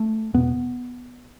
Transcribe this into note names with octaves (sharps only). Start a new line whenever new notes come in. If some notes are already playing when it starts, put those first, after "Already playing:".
Already playing: A3
E2 B2 B3